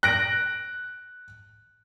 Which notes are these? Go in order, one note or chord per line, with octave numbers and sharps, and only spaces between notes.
F#6 A#6 D7